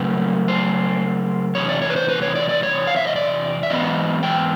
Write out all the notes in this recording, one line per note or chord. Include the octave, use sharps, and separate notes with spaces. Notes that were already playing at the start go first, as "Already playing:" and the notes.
Already playing: C#3 F#3 A3 B4
C5
E2 C3 C#5
D5
C#5
B4
C5
B4
C#5
D5
D5
C#5
F5
E5
D#5
D5
E5
G#2 E3 B3 D#5
G5